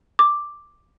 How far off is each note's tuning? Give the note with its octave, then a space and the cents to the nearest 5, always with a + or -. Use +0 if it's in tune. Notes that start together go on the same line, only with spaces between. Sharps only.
D6 +5